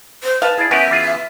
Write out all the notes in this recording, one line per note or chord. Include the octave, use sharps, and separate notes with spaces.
C5
B4 F5 A5
E4 G#4 D5
B3 C#4 G4 A#4 B4 E5
E3 F4 G#4